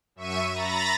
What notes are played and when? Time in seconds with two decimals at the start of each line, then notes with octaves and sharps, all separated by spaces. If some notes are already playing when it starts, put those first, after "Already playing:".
0.16 F#2 E5 C#6 D#7
0.53 A#5 B5 A6 A#6